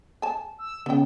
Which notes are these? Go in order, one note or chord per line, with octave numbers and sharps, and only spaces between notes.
G#5 A5
E6
C#3 B3 G5